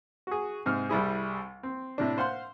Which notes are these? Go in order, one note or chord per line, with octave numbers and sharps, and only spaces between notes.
F#4 G#4
G#2 C3 F6
C2 G3 E4 G#4
C4
A2 C3 D4
C5 F5 F#5 C6